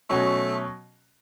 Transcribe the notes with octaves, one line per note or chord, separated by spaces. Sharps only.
B2 F#3 A3 C#4 F#4